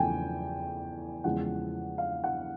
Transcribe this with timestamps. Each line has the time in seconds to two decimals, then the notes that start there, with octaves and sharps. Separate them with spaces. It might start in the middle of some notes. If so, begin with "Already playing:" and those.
Already playing: E2 C#3 F3 A3 G5 G#5
1.24 E2 C#3 F3 G#3 F#5
1.98 F5
2.24 F#5